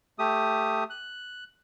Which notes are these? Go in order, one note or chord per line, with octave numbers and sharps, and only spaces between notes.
A3 G4 D#6
F#6